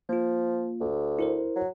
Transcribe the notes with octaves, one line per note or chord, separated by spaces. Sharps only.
F3 A#3 F4
D2
E4 A#4 C5
F#3